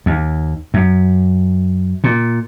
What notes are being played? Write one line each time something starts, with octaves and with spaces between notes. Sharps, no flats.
D#2
F#2
A#2